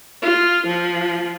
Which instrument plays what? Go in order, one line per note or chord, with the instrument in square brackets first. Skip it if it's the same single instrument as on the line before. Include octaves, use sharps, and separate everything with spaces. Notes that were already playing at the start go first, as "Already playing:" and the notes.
[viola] F4
F3